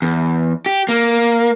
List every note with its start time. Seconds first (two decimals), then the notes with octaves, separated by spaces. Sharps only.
0.02 E2
0.66 G4
0.89 A#3